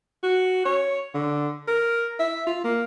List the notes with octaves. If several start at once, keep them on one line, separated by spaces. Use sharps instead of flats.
F#4
C#5
D3
A#4
E5
F4
A#3